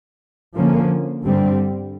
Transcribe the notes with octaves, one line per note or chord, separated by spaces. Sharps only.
D3 F3 A#3 C#4
G2 D3 G3 C4